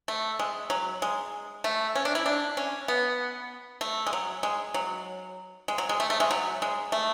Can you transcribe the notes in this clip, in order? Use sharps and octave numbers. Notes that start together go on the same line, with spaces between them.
A3
G#3
F#3
G#3
A3
C#4
D4
E4
D4
C#4
B3
A3
G#3
F#3
G#3
F#3
G#3
F#3
G#3
A3
A3
G#3
F#3
G#3
A3